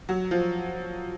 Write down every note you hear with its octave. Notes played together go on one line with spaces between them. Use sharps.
F#3
F3